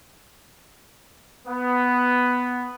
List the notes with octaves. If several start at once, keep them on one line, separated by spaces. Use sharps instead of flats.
B3